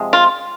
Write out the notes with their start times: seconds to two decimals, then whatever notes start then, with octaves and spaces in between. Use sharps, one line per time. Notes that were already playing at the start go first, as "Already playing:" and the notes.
Already playing: C3 F3 G#3
0.13 F4